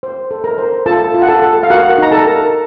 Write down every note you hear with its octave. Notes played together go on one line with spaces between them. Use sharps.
C5
A4
A#4 A#5
C5
F4 A4 A5
F4
F#5
A4 A5
A4
F5
F#4 A#4 F#5
D#4 A#5
A4 A5
A#4